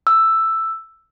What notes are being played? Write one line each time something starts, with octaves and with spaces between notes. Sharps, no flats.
E6